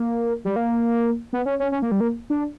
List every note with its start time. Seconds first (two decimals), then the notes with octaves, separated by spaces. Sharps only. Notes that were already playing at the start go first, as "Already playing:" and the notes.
Already playing: A#3
0.45 G3
0.56 A#3
1.33 B3
1.46 C#4
1.60 C#4
1.72 C#4
1.82 A#3
1.91 G3
2.00 A#3
2.30 D4